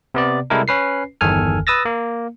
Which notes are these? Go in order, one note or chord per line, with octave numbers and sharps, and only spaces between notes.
C3 B3 D5
C3 G3 G#3 E4 A4 A#4
C#4 B4 C7
G1 E2 D#3 A4 G#5 F6
B4 D#6 E6 A6 A#6
A#3